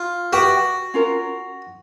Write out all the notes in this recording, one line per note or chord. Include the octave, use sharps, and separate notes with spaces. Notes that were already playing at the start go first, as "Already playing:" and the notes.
Already playing: F4
F#4 G4 B4 E5 G5
C#4 F4 A#4